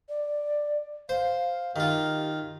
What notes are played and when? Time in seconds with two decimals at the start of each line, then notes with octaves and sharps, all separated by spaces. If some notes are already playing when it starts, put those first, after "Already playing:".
0.09 D5
1.09 C5 F5
1.76 D#3 F4 G4